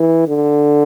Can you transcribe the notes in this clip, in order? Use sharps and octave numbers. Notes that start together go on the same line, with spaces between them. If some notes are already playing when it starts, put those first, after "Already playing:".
Already playing: E3
D3